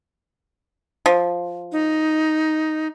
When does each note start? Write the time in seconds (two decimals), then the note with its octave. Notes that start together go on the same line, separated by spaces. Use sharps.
1.06 F3
1.72 D#4